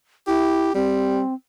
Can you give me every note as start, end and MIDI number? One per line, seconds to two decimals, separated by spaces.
0.27 0.74 64
0.27 0.71 67
0.75 1.21 55
0.75 1.34 60